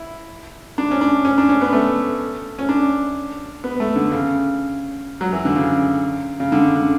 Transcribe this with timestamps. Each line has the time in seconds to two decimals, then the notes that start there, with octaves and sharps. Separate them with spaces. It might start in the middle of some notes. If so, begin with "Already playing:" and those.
Already playing: E4
0.78 D4
0.91 C#4
1.01 D4
1.25 C#4
1.38 D4
1.49 C#4
1.61 B3
1.73 A3
2.59 C#4
2.69 D4
3.64 B3
3.80 A3
3.96 D3
4.12 C#3
5.21 F#3
5.33 E3
5.45 D3
5.56 C#3
6.40 C#3
6.52 D3
6.75 D3